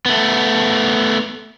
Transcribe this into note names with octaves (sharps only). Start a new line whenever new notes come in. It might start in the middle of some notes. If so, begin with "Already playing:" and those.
A3 B3